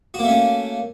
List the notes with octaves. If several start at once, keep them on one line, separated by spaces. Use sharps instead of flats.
A3 A#3 C#4 F#4